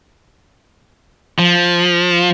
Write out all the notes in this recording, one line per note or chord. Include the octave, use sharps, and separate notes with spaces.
F3